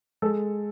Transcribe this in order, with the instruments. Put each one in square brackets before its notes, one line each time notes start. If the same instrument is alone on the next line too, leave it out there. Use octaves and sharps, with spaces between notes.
[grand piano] G#3 A4